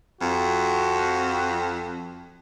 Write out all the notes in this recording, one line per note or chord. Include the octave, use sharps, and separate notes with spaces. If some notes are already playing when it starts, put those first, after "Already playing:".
F2 F#4